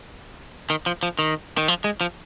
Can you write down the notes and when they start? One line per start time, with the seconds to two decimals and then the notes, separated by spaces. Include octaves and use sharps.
0.70 D#3
0.86 F3
1.03 F3
1.19 D#3
1.57 D#3
1.68 F3
1.84 G#3
2.01 F3